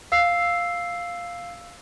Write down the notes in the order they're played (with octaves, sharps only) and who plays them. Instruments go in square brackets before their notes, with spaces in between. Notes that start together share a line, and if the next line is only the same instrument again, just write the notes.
[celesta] F5 E6 C7